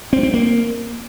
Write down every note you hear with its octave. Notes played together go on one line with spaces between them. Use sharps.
C4
C4
A#3